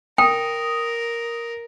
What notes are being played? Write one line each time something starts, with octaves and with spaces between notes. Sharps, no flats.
A#4 G5 D#6